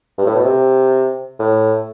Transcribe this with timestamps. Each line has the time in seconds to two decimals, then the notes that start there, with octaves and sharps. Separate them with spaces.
0.18 G2
0.26 A2
0.35 B2
0.44 C3
1.39 A2